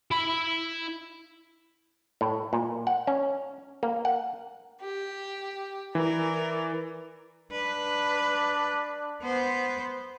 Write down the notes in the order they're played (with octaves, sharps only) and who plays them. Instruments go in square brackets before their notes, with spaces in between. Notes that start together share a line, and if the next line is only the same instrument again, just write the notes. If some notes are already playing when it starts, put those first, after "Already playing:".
[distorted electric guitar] E4 B5
[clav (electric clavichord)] A2
A#2
F#5
C#4
A#3
F#5
[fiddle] G4
[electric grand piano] E3 [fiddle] A#4 D5
[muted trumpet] D4 [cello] B4
[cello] B3 C5